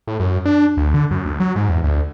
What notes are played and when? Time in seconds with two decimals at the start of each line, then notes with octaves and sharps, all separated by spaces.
0.08 A2
0.20 F#2
0.45 D4
0.77 D2
0.94 D3
1.11 F#2
1.25 D2
1.40 F#3
1.56 G#2
1.69 E2
1.84 D2